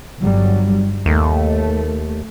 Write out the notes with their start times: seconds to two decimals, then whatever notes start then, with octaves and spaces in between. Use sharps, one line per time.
0.20 G1 F#3 G3
1.06 D#2 A3